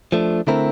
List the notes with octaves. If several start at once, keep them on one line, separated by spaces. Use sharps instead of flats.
F3 A3 D4
D3 A3 C4 E4 A#4